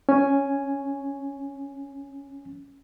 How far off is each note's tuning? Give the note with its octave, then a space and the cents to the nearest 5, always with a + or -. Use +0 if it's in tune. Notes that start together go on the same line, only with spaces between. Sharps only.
C#4 +0 G#5 +0